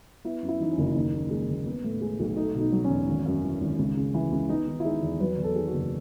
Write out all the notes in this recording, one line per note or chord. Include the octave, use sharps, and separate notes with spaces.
B3 E4
F#2
E4
E3 D#4
C#4
F#1
D#2 D#4
C#3
G#3
D#2
B3
A2
G#3
B1
A3 D#4
B2
D#4
F#3
C#4
E2
G#1
F#2
E3
G#1
C#2
C#3
E3
C#2
B3 D#4
D#3
E4
G#3 D#4
E2
F#3 B4
E2
A4
D#3 G#4
F#4
F#1